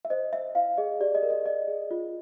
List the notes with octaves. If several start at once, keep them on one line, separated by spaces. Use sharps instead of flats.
E5
C5 D#5
C5 E5
E4 F5
G#4 D#5
G4 D5
D#5
A#4
D#5
D5 D#5
G#4
F4